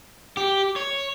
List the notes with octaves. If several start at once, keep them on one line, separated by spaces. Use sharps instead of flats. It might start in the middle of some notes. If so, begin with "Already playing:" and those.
G4
C#5